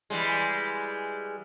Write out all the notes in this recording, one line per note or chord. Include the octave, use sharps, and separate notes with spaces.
E3 G3 G#3